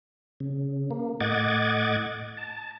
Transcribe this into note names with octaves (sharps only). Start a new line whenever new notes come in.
C#3
A#3
A2 D#5 F#5 D6 G#6 A6
A5